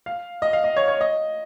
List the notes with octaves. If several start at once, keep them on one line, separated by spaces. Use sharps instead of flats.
F5
D#5
F5
D#5
C#5
C#5
D#5